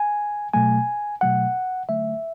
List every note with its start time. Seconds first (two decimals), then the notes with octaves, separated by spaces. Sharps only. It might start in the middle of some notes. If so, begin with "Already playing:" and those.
Already playing: G#5
0.54 B2 F#3 A3 G#5
1.21 B2 F#3 A3 F#5
1.89 D3 F#3 A3 E5